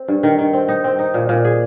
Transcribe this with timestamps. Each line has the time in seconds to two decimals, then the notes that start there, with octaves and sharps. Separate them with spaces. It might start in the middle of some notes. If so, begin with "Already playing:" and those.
Already playing: C4
0.08 G2
0.23 D#3
0.38 D#3
0.53 C4
0.68 D#4
0.84 C4
0.99 D#4
1.14 A#2
1.29 A#2
1.45 G#4